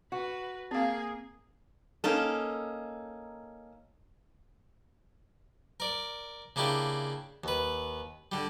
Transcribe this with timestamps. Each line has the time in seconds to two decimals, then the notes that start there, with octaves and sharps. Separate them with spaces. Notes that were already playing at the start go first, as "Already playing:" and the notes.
0.12 F#4 B4
0.71 A#3 C4 G#4 F5
2.04 A#3 C#4 D#4 A4
5.80 A#4 D5
6.56 C#3 A#3 D4 E4 G4
7.44 D#2 B4
8.32 D3 G3